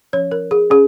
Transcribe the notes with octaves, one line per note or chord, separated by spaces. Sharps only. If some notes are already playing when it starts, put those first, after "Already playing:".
F3 C#4 C#5
A#4
G#4
C#4 G#4